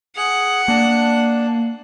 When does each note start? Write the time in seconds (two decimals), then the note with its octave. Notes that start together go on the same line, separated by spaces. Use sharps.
0.17 G#4 F#5
0.68 A#3 D4